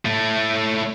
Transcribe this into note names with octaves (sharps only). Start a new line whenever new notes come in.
A2 A3